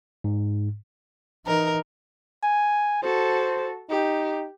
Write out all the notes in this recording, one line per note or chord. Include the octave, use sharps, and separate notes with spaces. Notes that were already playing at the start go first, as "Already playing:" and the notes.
G#2
E3 D#4 A#4
G#5
F#4 A4 C5
D#4 G4